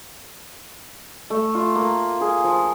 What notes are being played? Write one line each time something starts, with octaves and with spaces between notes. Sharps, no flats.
A3
F4
A#3
G#4
F3